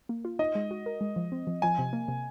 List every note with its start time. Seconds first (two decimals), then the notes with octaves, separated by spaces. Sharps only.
0.09 A#3
0.25 F4
0.39 D#4 D#5
0.55 G#3
0.71 F#4
0.86 A#4
1.01 G#3
1.16 F3
1.32 C4
1.47 F3
1.62 F3 G#5
1.79 C3
1.93 A#3
2.08 C3